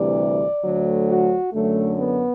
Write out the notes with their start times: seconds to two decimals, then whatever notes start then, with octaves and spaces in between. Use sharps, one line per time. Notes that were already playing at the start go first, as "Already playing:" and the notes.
Already playing: D2 C3 E3 G3 D5
0.63 D2 D3 F#3 A3
1.09 F#4
1.53 F#2 D3 F#3 A3
1.99 B3